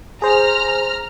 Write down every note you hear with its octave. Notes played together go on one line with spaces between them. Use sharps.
G#4 C5 A#5 F6